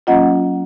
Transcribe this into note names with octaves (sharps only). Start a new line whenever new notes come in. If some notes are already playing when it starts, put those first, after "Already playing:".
F#3 A#3 C#4 F4 D#5 F#5